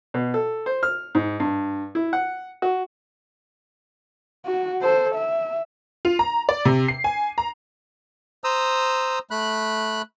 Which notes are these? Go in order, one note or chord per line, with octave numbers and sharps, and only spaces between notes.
B2
A4
C5
F6
G#2
G2
E4
F#5
F#4
F#4
A4 C5
E5
F4
A#5
D5
C3
C7
G#5
A#5
C5 A#5 D#6 E6
A3 B5 F#6